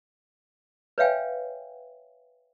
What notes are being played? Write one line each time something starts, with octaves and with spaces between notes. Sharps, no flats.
B4 C#5 E5 F5 G5 G#5